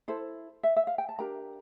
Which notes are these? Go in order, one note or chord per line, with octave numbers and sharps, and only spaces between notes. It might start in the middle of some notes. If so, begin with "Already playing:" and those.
E4 A4 C5
E5
E5
F5
G5
A5
D4 G4 A#4 A#5